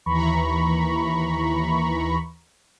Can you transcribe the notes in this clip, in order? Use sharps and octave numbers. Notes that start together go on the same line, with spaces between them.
D#2 E3 A#5 B5 C#6